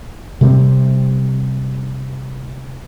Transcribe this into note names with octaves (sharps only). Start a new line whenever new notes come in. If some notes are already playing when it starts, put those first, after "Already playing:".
C3 G3 A3 C4